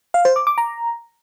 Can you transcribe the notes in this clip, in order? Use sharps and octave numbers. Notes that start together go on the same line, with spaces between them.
F5
C5
D6
D6
A#5